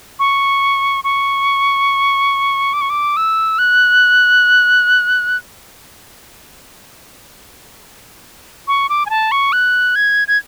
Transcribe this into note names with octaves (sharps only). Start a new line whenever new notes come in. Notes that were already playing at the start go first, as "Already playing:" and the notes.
C#6
C#6
D6
C#6
D6
E6
F#6
C#6
D6
G#5
A5
C#6
F#6
G#6
G#6